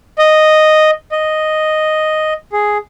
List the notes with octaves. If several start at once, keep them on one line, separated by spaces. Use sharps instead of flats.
D#5
D#5
G#4